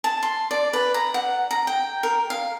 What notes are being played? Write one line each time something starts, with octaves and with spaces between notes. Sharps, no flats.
A5
C6
D5
B4
A#5
F#5
A#5
G5
A#4
F5